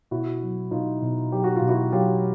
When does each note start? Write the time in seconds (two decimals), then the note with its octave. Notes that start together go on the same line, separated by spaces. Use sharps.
0.11 B2 E4 F#4
0.42 F#3
0.71 B2 D#4 F4
1.02 B2
1.32 F#3 G4
1.44 F#4
1.56 F4
1.61 B2
1.68 E4 F#4
1.92 F#3 F4 G4